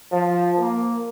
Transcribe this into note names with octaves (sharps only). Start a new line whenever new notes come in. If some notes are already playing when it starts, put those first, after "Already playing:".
F3
A#3